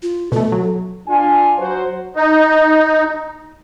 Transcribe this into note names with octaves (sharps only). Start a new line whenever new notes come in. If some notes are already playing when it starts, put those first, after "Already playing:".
F4
B2 A3 A4
F#3
D4 F4 G#5
F#3 F#4 C5
D#4